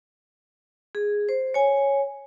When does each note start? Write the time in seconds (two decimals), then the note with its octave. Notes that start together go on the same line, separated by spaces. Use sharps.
0.95 G#4
1.29 C5
1.54 C#5 G#5